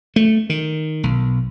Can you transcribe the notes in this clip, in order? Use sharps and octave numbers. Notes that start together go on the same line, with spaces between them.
A3
D#3
B1